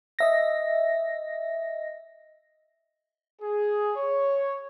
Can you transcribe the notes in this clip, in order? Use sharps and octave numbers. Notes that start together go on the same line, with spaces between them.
D#5 E5 A#6
G#4
C#5